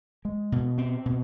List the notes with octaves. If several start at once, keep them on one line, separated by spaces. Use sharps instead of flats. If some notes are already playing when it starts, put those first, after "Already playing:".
G#3
B2
C4
B2